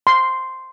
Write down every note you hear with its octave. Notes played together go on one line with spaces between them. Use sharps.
C6